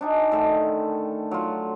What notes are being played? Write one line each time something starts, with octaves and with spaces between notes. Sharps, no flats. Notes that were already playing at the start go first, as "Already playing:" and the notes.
D4 D#4 G#5
A2 D3 D#3 A3
F#3 F4